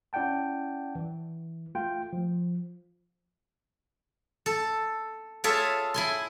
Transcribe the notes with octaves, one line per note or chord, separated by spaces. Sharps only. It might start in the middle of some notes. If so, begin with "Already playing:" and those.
C#4 E4 D5 F#5 G5 A5
E3
A3 F4 G5
F3
A4
F4 G#4 A4 C#5 E5
E4 G#5 C6